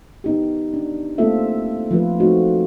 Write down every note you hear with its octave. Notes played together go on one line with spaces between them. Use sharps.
B3 D#4 G4
D4
A3 A#3 C4 F4 A4 E5
F3 A3 F4 B4
A3 C4 D#4 F#4